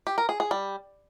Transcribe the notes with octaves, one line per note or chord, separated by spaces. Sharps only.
G4
A#4
G#4
G#4
G3